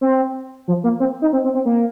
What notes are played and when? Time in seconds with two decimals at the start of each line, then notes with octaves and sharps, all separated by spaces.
0.01 C4
0.68 F3
0.84 A#3
1.00 C4
1.22 D#4
1.33 C4
1.44 C4
1.54 C4
1.65 A#3